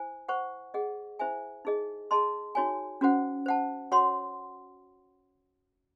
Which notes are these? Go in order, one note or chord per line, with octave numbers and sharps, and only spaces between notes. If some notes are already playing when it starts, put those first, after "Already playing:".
Already playing: E4 C5 G#5
C5 F#5 C#6
G#4 D#5 F#5
E4 C5 E5 G#5
D#4 G#4 D#5
G#4 D#5 A5 C6
D#4 F#4 C#5 G#5
C#4 F#4 C5 F#5
C5 F#5 A5
F#4 C#5 F#5 C6